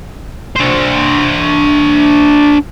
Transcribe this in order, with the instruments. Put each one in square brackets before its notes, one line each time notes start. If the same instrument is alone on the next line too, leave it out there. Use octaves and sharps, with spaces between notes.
[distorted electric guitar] D4 C5